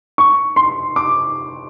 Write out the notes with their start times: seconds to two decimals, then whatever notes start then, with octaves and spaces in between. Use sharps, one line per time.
0.18 C#6
0.56 C6
0.96 D6